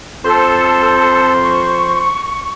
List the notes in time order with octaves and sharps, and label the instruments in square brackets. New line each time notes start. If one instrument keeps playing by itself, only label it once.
[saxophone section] F2 C5 [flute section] A4
[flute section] C#6